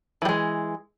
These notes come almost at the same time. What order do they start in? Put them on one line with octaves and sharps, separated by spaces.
E3 G3 G#3